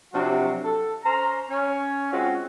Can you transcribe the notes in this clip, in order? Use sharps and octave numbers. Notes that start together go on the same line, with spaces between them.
C3 F3 F#3 D4 F#4
A4
C#4 C5 A#5
C#4 C#5
G#3 C4 C#4 F4 F#4